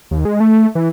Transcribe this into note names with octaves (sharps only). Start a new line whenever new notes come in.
D#2
G#3
A3
E3